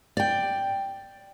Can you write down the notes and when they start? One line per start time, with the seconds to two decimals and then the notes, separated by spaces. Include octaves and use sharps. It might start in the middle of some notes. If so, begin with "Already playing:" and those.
0.17 D5 G5